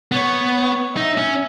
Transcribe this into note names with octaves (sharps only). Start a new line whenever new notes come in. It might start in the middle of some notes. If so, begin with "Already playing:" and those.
B3 C#5
C#5
D#4 E5
C#4